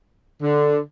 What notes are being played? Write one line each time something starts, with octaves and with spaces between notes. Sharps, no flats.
D3